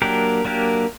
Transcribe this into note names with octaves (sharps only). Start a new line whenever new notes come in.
F#3 A#3 D4 G4 A#4
F#3 A#3 D4 G4 A#4